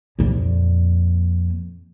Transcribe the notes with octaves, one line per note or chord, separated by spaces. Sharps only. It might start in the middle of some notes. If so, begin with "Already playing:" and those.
F2 A#2